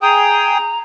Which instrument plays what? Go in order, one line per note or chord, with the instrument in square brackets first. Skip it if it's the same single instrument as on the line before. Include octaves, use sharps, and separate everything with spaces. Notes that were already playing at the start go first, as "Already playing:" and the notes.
[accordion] G#4 G5 D#6 [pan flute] A#5